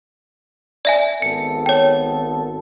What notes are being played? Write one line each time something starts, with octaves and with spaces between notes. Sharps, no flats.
D5 E5 G#5
G#1 B3 A4 C#7
C#5 G5